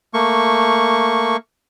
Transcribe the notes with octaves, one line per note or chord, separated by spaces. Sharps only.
A3 A#3 C#6